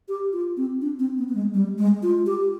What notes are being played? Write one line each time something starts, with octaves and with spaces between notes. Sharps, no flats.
G4
F4
C4
D4
C4
B3
B3
G#3
G3
G#3
F4
G4